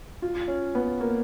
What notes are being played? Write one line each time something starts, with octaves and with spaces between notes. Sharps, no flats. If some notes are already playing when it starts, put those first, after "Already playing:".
F4
C#4
B3
A#3